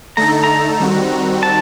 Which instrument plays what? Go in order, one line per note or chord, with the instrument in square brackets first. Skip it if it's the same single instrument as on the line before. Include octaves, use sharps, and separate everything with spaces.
[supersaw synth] D3 A3 D#4 A4 [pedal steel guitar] A#5
[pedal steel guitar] A#5
[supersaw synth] D#3 G3 C4 F#4
[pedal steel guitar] A5